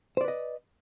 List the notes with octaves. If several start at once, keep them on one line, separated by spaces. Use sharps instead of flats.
B4 C5 D5 D#5